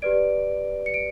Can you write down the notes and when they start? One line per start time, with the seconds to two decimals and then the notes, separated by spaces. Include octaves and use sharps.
0.02 G4 B4 D5 D7
0.86 C#7
0.94 D7